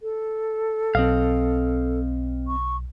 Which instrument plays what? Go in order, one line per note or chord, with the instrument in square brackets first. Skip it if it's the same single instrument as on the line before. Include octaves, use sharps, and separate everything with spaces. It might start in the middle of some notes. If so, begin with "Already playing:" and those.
[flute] A4
[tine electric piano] B1 [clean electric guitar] C4 D#5 F5
[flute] C#6